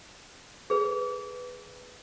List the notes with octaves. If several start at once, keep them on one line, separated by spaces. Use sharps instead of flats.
G#4 B4